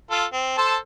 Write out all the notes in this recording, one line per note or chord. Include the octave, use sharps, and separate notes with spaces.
F4 A4
C4
A4 C5 A5